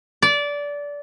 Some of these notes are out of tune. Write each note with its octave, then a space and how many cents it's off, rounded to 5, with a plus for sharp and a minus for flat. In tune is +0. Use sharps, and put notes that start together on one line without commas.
D5 -20